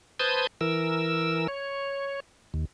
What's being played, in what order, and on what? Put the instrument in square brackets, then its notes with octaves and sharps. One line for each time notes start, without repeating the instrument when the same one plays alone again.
[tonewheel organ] B4 C5 A5 D#6 G6 G#6
E3 A#4 E6
C#5
D#2